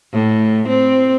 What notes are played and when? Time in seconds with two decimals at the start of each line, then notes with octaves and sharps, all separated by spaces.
0.14 A2
0.68 C4